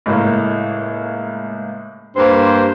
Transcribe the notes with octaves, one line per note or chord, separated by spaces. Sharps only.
C#2 A2 A#3
G2 A#3 C5